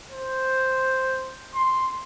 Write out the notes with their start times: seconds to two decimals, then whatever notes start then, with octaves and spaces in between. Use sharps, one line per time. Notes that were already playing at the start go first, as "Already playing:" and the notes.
0.10 C5
1.55 C6